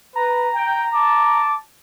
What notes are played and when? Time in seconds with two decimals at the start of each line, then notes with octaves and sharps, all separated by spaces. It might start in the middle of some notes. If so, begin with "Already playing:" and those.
0.16 B4 A#5
0.54 G5
0.93 A5 D6